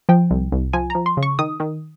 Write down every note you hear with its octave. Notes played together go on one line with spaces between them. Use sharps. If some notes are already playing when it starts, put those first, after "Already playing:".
F3 G5
C2
C2
F3 G#5
F3 A#5
C6
C#3
C#6
D#3 D#6
D#3